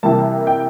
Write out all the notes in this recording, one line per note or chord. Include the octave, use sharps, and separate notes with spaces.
C3 E3 G3 A#3 A5
G5